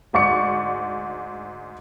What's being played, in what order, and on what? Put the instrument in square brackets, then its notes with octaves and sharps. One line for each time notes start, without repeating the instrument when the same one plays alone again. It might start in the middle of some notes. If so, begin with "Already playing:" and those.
[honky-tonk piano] D2 G#2 D5 C#6 C#7